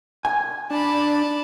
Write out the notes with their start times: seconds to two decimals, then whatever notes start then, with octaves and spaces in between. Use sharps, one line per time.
0.25 G#5
0.71 D4 A5 B5